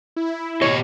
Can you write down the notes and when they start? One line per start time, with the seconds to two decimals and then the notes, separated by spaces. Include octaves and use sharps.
0.17 E4
0.62 B2 G4 C#5 D#5